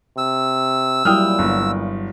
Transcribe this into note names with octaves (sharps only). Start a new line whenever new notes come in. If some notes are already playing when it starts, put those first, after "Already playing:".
C3 E6
A#2 F#3 G3 E4 G5 D#6 F6
G1